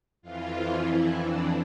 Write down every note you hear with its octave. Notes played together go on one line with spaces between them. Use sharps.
F2 E3 F4
E4
D4